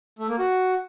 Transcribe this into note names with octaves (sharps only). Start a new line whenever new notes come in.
A3
A#3
F#4